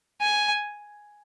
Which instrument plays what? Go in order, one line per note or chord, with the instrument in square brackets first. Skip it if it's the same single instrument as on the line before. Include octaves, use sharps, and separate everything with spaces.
[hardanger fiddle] G#5